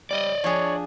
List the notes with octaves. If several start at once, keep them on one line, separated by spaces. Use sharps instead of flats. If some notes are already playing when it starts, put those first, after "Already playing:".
G3 D5 D#5
F3 D4 G#4 C#5